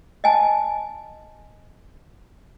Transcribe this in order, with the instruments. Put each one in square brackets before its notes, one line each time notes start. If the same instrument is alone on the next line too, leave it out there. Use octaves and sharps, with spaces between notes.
[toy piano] D#5 G#5 A5